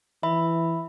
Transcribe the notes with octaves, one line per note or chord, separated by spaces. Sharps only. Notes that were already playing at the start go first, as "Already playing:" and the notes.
E3 E5 B5